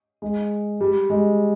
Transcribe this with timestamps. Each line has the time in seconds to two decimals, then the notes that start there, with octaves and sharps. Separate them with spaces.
0.22 G#3
0.81 G3
1.10 G#3